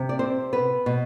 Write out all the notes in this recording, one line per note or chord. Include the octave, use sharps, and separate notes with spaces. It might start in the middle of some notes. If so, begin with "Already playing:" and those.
Already playing: C3
D5
C4 C5
B3 B4
B2